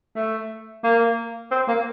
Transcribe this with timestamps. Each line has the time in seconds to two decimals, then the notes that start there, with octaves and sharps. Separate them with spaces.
0.16 A3
0.84 A#3
1.51 C4
1.68 A#3